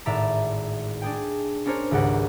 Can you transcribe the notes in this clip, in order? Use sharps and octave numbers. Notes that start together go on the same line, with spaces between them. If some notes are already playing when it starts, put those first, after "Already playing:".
G#1 A2 D5 E5 A#5
D4 G#4 G5
C#4 D4 A#4 C5 C#5
G#1 C#2 G#2 G4 F#5 A#6